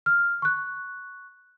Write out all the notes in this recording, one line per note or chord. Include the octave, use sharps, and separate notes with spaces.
F6
C#6 F#6